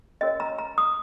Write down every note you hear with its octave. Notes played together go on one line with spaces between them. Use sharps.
C#4 F#4 A#4 C#5 D#5
A#5
A#5
D#6